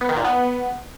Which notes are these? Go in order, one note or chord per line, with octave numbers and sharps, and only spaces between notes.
B3
D#3
A#2
B3